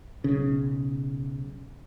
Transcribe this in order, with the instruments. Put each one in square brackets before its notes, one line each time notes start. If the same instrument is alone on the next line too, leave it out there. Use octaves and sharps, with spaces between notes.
[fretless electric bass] B1 C#3